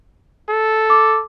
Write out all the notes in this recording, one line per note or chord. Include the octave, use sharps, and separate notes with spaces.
A4
D6